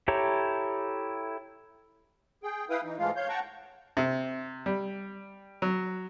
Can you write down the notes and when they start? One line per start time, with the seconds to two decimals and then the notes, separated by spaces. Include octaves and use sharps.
0.08 E4 G4 A4 C#5 A#5
2.43 G#4 G5
2.70 E4 B4 F5 G5 D#6
2.84 E3 D#4
2.98 G#2 E3 G#3 A3 F4 F5
3.16 C#5 F5 G6
3.29 F#5 G5 A5 A#5 C#6
3.97 C3
4.66 G3
5.62 F#3